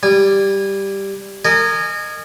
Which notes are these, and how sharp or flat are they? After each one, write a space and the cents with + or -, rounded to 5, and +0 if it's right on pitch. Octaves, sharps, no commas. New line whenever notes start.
G3 +0 G#5 -25
A#4 -25 D#5 -30 G#5 +0